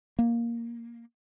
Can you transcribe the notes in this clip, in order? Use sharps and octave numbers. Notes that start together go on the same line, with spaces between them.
A#3